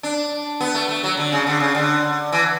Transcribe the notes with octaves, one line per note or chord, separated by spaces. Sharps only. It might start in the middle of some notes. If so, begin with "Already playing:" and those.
D4
B3
A3
A3
F#3
D3
C#3
D3
C#3
D3
E3